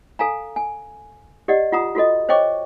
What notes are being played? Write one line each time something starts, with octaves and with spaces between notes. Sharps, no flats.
A4 F5 G#5 A#5
G#5
G4 D5 D#5 F#5
F4 F#5 A#5 D#6
F4 F#4 A4 D#5
C5 C#5 D#5 G5 C#6 D6